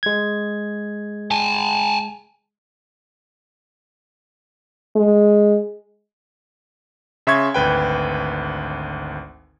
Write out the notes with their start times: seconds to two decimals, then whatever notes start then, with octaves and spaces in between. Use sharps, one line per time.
0.03 G#3 G#6
1.31 G#5 A5
4.96 G#3
7.27 C#3 E5 C6 C#6 G#6
7.54 G#1 D2 B4 G5